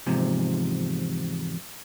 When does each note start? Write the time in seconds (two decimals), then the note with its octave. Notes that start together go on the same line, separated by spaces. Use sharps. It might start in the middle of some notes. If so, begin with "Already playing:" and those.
0.06 E2 G#2 C3 F3